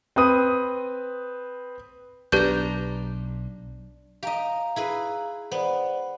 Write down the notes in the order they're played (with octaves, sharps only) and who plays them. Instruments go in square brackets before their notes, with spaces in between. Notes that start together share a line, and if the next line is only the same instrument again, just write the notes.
[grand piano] C4 B4 D#6 D#7
[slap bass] B1 [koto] D4 A#5 [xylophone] G4 B4 G6
[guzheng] G4 D#5 [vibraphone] F5 A#5
[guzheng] E4 G#4 B4
[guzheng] B3 [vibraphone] C5 D5